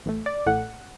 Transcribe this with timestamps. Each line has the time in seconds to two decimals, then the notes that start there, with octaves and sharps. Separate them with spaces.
0.06 A1 A2 A3
0.26 D5
0.46 A1 A2 A3 F#5